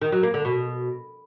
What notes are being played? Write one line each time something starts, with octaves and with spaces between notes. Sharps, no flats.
D#3
F#3
A#3
D3
B2